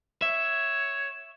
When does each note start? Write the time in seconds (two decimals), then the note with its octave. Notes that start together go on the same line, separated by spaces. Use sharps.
0.22 C#5 E5